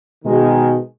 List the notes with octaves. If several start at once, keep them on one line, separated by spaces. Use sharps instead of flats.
B2 D#3 G#3